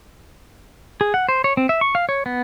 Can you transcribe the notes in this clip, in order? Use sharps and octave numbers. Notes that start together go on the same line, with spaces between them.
G#4
F#5
C5
C#5
C4
E5
C#6
F5
C#5
B3